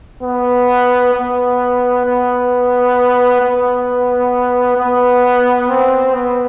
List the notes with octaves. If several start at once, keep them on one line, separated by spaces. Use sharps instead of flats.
B3
B3
B3
B3
B3
C4
B3